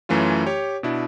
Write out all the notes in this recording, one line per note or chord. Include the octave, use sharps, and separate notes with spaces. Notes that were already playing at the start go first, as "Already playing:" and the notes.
F#2 E3 A3 C#4 F4
G4 C#5
B2 D4 E4